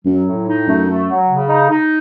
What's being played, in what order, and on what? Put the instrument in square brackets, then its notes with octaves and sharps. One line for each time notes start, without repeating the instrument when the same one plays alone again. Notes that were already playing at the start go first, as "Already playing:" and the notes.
[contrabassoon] F#2 [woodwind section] F#3
[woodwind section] A2
D#4
[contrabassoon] F#2 [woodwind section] A3
[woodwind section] A3
F#3
C#3
D#4
D#4